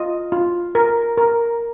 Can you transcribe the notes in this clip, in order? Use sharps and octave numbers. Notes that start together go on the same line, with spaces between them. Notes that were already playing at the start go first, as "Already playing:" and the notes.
Already playing: F4 D#5
F4
A#4
A#4